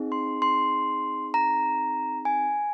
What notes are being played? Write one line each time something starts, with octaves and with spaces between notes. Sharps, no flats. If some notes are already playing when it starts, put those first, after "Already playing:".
Already playing: C4 D#4 G#4
C6
C6
A#5
G#5